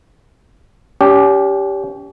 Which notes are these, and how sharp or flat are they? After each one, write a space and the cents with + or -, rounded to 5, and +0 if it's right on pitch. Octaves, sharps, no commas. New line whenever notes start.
C#4 +40 G4 +0